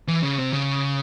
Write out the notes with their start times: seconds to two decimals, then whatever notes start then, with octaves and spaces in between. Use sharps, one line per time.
0.08 E3
0.23 C#3
0.38 C3
0.53 C#3